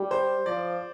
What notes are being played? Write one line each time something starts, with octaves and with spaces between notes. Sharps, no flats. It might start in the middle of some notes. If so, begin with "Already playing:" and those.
Already playing: G3
C5
F3 D5